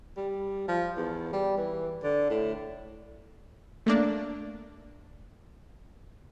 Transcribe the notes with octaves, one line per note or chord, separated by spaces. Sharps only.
G3
F3
E2
G3
E3
D3
A2
A3 A#3 D4